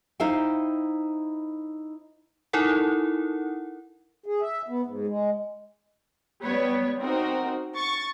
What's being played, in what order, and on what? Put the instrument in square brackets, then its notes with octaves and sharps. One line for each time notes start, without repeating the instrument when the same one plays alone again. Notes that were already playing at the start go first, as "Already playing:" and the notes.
[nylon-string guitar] D#4 E4 C5 E5 F5 G5
[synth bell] D#4 E4 A4 A#4 F#5
[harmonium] G#4
E5
B3
G#2
G#3
[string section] G3 B3 C#5
C4 D#4 F#4 A#4
C#6 A6